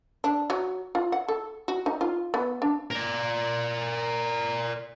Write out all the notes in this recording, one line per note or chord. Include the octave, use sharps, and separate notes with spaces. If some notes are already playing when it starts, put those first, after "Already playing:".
D4
F#3
F4
F#5
A4
F#4
D#4
F4
B3
D4
A#4 D5